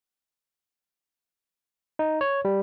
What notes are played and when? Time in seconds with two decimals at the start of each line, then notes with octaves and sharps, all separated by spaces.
1.99 D#4
2.21 C#5
2.45 G3